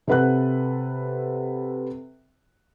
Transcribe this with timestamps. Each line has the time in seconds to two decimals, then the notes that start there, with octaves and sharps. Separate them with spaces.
0.07 C3 A4 B4 F#5 F#6